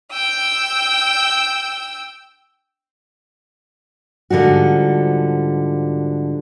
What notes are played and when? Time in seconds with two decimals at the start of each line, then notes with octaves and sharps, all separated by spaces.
0.13 G5 E6
4.30 G#2 D3 F3 G3 F#4